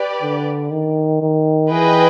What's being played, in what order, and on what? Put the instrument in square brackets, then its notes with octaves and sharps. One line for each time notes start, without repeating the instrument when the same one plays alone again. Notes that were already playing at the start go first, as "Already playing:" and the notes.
Already playing: [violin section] G4 B4 D5
[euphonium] D3
D#3
D#3
[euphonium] E3 [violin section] G#4 B4 D#5 G5